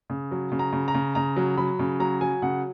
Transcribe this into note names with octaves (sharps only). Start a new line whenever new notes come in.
C#3
F#3
C#3
A#5
C#3
A#5
C#3
C#3 A#5
F#3
F#3 B5
C#3
F#3 A#5
F#3 G#5
C#3 F#5